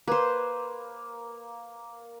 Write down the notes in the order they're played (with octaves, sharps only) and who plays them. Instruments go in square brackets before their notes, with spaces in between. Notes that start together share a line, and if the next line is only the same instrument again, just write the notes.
[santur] A#3 [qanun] B4 C5